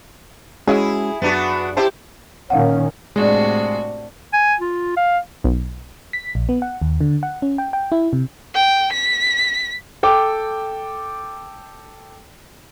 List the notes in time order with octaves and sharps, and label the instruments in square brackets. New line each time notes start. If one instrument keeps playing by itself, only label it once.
[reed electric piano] G#3 C#4 F#4 [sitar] E4 G#4
[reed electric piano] F#2 [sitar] B3 D4 F#4
[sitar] E4 G4 C5 [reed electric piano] E5 A5
[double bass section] A#2 D#3 C#4 [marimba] F5 F#5
[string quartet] A2 C3 F#4 [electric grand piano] G#3 [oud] D4
[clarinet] G#5
F4
F5
[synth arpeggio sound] B1
[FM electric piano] B6
A#1
B3
F#5
D#2
D3
F#5
C#4
G5
G5
E4
C3
[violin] G5
B6
[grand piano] A4 G5 D6